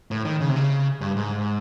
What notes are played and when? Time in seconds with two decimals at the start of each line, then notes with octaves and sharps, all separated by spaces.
0.11 A2
0.25 D#3
0.41 C#3
0.49 C3
0.56 C#3
1.01 G2
1.16 G#2